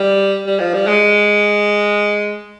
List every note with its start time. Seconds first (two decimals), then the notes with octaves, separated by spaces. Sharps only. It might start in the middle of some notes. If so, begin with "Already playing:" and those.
Already playing: G3
0.47 G3
0.60 F3
0.74 G3
0.87 G#3